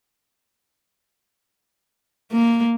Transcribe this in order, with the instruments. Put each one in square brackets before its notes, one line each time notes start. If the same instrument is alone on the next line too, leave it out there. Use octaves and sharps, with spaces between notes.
[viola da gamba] A#3